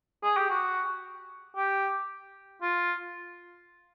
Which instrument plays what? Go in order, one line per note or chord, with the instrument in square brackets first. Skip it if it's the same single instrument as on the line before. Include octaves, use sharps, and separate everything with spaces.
[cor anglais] G#4
G4
F#4
G4
F4